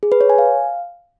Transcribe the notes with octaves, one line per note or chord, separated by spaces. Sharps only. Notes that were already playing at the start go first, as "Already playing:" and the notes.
G#4
B4
C#5
G#5
F5